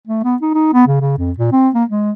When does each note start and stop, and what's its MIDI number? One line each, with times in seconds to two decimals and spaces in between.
0.07 0.22 57
0.24 0.35 59
0.42 0.51 63
0.54 0.73 63
0.74 0.85 59
0.87 1.00 49
1.01 1.13 49
1.18 1.31 41
1.38 1.50 46
1.52 1.69 60
1.74 1.84 58
1.89 2.12 56